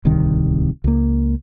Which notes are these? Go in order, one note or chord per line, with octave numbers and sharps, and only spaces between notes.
D1 C2 C3 D#3
C#2 A#3